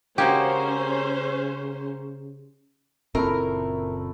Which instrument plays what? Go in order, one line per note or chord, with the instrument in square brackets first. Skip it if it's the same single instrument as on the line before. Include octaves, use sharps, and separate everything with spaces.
[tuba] C#3 [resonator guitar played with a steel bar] G#3 A#3 F#4 [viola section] C#4 C5 [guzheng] G4
[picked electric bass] F#1 A#2 C4 [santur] A3 E4 [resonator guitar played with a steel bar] A#4